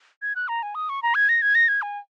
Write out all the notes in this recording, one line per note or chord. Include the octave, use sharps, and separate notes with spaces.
G#6
F#6
A#5
G#5
D#6
C#6
A#5
G#6
A#6
G#6
A#6
G#6
G#5